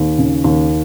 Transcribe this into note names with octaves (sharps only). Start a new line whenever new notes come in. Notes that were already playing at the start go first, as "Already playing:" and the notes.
Already playing: D#2
C#3
D#2